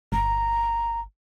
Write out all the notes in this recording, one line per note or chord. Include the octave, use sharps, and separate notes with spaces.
G1 A#5